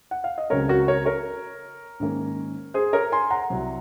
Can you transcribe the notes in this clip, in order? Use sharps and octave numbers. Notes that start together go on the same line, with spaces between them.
F#5
F5
D#5
C#2 C#3 F#3 C4 A#4 C#5
F#4 A#4
A#4 C#5
A#4 C#5
G#2 D#3 A#3 C#4
G#4 C5
A#4 C#5
G#5 C6
F#5 A#5
C2 C3 F#3